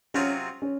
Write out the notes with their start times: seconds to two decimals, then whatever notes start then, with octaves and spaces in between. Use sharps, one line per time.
0.14 C3 F#3 C4 C#4 F4 G#4
0.62 C#4